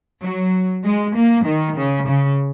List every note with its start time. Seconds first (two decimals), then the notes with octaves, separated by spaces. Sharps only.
0.23 F#3
0.84 G#3
1.15 A#3
1.46 D#3
1.76 C#3
2.07 C#3